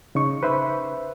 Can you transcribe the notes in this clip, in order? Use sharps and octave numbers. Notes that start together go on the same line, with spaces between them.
C#3 D#4 C#6
B4 C5 E5 B5